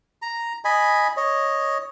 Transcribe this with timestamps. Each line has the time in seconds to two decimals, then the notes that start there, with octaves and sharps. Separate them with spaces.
0.22 A#5
0.65 D#5 G#5 B5
1.17 C#5 D#5